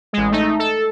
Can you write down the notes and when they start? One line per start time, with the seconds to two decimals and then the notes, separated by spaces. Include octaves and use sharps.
0.13 A1 G#3
0.31 A3 D#4
0.59 A4